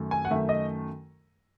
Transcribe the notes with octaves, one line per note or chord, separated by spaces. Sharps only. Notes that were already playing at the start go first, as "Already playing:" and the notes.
Already playing: F#2 D#3 A3
G#5
F#5
F#2 D#3 A3 E5
D#5